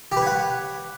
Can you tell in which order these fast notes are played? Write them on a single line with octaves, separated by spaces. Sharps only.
G4 B4 C#5 F#5